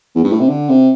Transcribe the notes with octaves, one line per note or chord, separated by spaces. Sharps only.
E2
G2
A2
C3
D3
C3